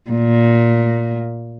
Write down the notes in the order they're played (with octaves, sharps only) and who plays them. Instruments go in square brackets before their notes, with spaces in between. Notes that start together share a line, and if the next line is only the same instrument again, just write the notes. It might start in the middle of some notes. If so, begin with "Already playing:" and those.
[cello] A#2